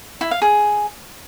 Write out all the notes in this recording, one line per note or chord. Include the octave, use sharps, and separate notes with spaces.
E4
F5
G#4